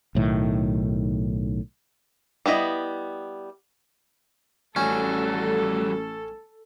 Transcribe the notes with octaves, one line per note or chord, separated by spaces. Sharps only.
B1 A2 D#3
G3 B3 E4 D#5
A1 G3 C#4 F#4 A4